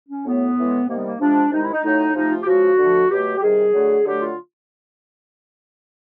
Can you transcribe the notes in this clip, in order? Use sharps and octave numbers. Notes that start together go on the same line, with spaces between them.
C#4
A2 F#3 A3 B3
A2 E3 G#3
C3 D#3 G3 A#3
B3
A#3
C3 F3 G#3 D4
C3 D#3 G#3 D#4
E4
D#4
A2 F#3 A3 D#4
C3 F3 A3 D#4
F4
G4
C#3 F3 G#3 F#4
D3 F3 A3
B2 F#3 A3 G4
G4
C3 D#3 G3 G#4
D3 F#3 A3
D3 F#3 A3 G4
F4